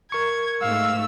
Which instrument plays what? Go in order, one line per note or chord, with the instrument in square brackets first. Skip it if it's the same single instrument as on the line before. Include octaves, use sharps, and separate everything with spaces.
[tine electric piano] A#4 C#6 [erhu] G#6
[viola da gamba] G#2 A3 [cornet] F5 [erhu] E6